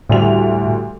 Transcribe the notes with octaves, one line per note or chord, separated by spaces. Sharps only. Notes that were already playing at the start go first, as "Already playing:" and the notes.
D2 A2 G3 F7